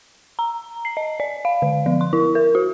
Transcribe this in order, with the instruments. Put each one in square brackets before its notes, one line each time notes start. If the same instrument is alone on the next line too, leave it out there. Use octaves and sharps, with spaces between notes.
[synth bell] A#5
C7
D#5
D5
F5
D3
F3
C6
E4
A#4
F#4